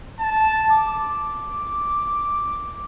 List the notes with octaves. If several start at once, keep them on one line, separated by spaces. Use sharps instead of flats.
A5
D6